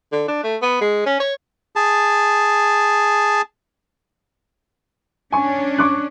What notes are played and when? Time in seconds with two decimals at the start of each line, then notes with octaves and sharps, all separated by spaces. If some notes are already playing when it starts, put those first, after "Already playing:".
0.12 D3
0.28 D4
0.43 A3
0.62 B3
0.81 G#3
1.06 C#4
1.20 C#5
1.76 G#4 A5
5.32 C#4 D4 G#5 C#6
5.78 C#6 D6 F#6